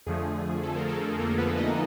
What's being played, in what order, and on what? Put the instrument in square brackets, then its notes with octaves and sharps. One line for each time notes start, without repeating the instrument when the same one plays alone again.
[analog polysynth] F2 D3 F3 A3 G#4
A4
A#4
A4
A#3 A#4
B3 B4
D#4 D#5